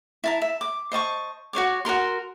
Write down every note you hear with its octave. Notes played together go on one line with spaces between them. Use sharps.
E4 A5 A#5
E5
D6
C5 D#5 A5 C#6
F#4 C5 C#5 D6
F#4 G#4 A#4 C6